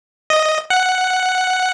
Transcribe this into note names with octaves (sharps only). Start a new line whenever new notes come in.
D#5
F#5